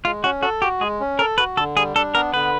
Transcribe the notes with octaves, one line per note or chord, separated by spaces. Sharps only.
G#3 F4
C#4 F#4
F#4 A4
F#4 G4
G#3 G#4
C#4
A4 A#4
F#4 B4
D3 A4
G3 G#4
D4 A4
B3 A#4
D3 B4